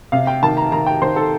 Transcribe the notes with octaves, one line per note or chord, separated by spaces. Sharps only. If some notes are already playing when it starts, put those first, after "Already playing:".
C3 F5
G5
D#3 A5
A#5
D#3 A#5
G5
D#3 C5
A4